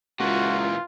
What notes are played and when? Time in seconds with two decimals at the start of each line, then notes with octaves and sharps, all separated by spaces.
0.20 C#2 A#2 E3 F4 F#4